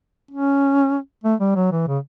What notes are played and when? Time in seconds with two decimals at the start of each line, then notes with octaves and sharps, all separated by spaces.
0.31 C#4
1.24 A3
1.40 G3
1.56 F#3
1.71 E3
1.87 C#3